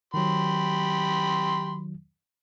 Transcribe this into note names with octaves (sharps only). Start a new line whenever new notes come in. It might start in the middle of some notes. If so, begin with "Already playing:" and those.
D#3 F#3 G4 B5 C6